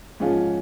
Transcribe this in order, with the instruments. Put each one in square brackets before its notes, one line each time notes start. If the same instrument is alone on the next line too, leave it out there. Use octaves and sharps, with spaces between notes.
[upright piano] G#2 F3 C#4 F4